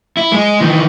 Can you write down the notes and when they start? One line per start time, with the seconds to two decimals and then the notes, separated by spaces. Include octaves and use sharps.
0.17 E4
0.32 G#3 G#4
0.60 D#3 E3